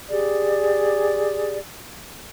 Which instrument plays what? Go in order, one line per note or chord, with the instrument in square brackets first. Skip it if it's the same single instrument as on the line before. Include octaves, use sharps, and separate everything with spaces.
[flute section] G4 G#4 D5